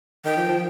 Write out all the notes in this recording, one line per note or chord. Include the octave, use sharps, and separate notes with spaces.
D#3 G5
F3
F3